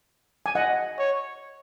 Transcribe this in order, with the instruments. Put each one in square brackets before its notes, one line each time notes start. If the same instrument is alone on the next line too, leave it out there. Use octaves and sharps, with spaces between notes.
[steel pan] G#5
D#5 F#5
[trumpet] C#5